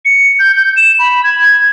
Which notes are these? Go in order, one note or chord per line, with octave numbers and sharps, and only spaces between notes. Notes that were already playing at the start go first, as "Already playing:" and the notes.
C#7
G6
G6
E7
B5
G#6